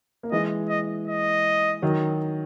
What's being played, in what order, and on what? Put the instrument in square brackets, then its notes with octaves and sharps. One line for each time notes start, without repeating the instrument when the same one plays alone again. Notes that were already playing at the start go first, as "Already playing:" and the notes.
[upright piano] A#3
[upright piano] E3 G#3 [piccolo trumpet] D#5
[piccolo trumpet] D#5
D#5
[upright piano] D#3 F#3